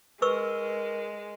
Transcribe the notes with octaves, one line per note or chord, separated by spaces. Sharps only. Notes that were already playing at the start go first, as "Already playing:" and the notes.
G#3 A#4 B4 C#6 E6